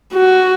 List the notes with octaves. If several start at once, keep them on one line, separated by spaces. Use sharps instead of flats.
F#4